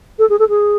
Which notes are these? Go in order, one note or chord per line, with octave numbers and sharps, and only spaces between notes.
A4
G#4
A4
G#4